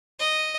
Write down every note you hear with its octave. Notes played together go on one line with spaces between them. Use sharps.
D#5